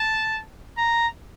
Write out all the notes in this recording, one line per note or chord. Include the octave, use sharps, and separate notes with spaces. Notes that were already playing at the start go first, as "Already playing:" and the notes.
Already playing: A5
A#5